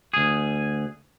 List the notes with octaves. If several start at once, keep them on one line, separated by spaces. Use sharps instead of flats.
D2 G#4